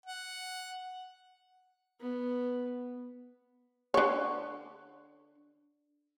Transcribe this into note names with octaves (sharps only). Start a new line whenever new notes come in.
F#5
B3
D3 C#5